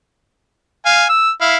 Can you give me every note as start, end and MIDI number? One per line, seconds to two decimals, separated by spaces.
0.86 1.05 77
0.86 1.05 80
1.09 1.30 88
1.41 1.58 64
1.41 1.58 77